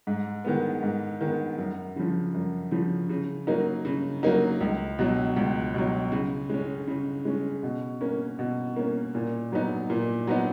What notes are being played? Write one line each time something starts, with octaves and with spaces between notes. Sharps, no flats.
G#2
D#3 G#3 B3
G#2
D#3 G#3 B3
F#2
C#3 F3
F#2
C#3 F3
C#3
F#3 A#3 D#4
C#3
F#3 A#3 D#4
C#2
B2 F#3
C#2
B2 F#3
C#3
G#3 C#4
C#3
G#3 C#4
B2
A#3 C#4
B2
A#3 C#4
A#2
F#3 B3 D#4
A#2
F#3 B3 D#4